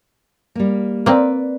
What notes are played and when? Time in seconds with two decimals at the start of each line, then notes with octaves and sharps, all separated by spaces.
0.55 G3 A#3
1.06 A#3 C4 B4 D5